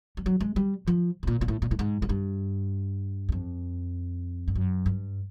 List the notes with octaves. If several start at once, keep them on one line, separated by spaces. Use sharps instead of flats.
G3
F#3
G#3
G3
F3
A2
A#2
A#2
A2
A#2
A2
G#2
G#2
G2
E2
F2
G2
F#2
G2